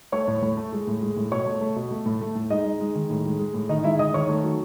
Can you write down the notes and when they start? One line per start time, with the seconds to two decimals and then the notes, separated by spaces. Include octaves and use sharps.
0.12 A3 C#5 C#6
0.28 A2
0.43 A2
0.57 A3
0.73 G#3
0.87 A2
1.02 G#3
1.17 A2
1.32 B2 C#5 C#6
1.46 A3
1.61 A3
1.76 B2
1.91 A3
2.06 A2
2.21 A3
2.35 A2
2.50 G#3 D#4 D#5
2.65 G#3
2.81 G#3
2.95 D#3
3.10 A2
3.25 G#3
3.39 G#3
3.54 A2
3.69 D#3 D#4 D#5
3.84 G#3 E4 E5
3.99 D#3 D#5 D#6
4.14 D#3 C#5 C#6
4.29 A3
4.44 F#3